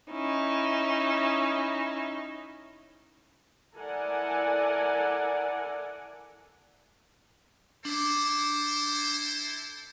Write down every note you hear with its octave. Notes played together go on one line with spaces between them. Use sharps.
C#4 D#4 E4
E4 A4 A#4 D5 F#5 G#5
D4 E4 A4 C5 D6